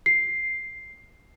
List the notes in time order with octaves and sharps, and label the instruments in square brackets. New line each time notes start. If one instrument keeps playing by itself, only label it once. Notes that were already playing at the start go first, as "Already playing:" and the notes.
[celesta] C7